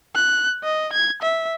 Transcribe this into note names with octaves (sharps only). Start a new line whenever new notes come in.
F#6
D#5
G#6
E5